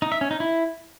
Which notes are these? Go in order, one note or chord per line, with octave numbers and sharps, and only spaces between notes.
D#4
E5
C#4
D#4
E4